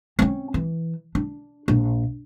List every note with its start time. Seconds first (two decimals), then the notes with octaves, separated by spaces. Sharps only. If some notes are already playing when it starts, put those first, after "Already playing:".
0.19 C4 C#4
0.54 E3
1.15 D4
1.68 A#1